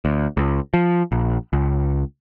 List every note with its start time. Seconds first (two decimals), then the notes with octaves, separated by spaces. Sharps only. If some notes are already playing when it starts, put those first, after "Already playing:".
0.05 D2
0.37 C#2
0.74 F3
1.12 A#1
1.53 C#2